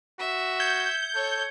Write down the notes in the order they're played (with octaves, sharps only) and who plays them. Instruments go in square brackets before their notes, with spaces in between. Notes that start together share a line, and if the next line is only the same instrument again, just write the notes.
[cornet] F#4 [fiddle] E5
[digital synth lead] G6 [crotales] G#6 C#7
[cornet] A4 [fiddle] C#5